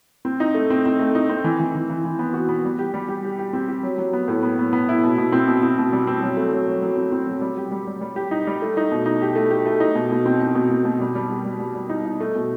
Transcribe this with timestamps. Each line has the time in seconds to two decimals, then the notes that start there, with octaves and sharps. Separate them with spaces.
0.25 C4
0.40 D#4
0.55 A3
0.70 C4
0.86 C4
0.99 A3
1.15 D#4
1.29 C4
1.44 E3
1.60 E3
1.75 E3
1.90 E3
2.04 E3
2.19 B3
2.34 F#4
2.49 B3
2.65 G3
2.79 G4
2.94 G3
3.09 G4
3.25 G4
3.39 G4
3.53 C4
3.69 G4
3.83 F#3
3.98 F#3
4.13 B3
4.28 A2
4.43 B3
4.59 B3
4.73 B3
4.89 E4
5.04 B2
5.18 B2
5.32 C4
5.48 B2
5.63 C4
5.78 B2
5.93 G3
6.07 C4
6.22 F#3
6.37 A3
6.53 F#3
6.68 F#3
6.82 F#3
6.97 C4
7.12 C4
7.27 F#3
7.42 G3
7.58 G4
7.71 G3
7.87 G3
8.01 G3
8.16 G4
8.31 D#4
8.47 G3
8.62 A3
8.77 D#4
8.91 B2
9.06 D#4
9.22 G4
9.36 A3
9.51 G4
9.66 A3
9.80 D#4
9.95 B2
10.11 B2
10.26 C4
10.41 D#4
10.55 B2
10.70 B2
10.85 B2
11.01 G3
11.15 G3
11.30 G4
11.45 G3
11.60 G3
11.75 G3
11.90 D#4
12.06 D#4
12.20 A3
12.35 B2